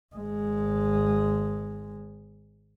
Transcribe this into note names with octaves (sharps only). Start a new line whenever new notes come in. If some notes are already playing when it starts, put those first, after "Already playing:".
G#1 G#3